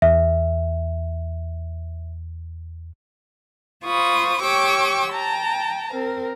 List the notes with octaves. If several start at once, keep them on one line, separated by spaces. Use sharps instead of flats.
E2 E5
F4 C5 B5 C#6 D#6
G4 C#5 G5 C#6 D6 E6
G5 A5 A#5
C4 A#4